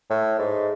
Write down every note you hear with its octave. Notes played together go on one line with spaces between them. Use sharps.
A2
G#2